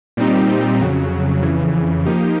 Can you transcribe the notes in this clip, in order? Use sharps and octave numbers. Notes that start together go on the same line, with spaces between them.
A#2 G3 C4 D#4 G4
F2 C#3 F#3
F2 C#3 E3
F3 A#3 D#4 G4